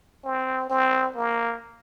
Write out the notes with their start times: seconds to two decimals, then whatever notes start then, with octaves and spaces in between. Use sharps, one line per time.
0.25 C4
0.70 C4
1.16 A#3